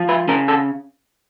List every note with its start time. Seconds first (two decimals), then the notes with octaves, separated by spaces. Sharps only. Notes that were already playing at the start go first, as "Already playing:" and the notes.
Already playing: F3
0.09 B4
0.28 C#3 A#4
0.48 A4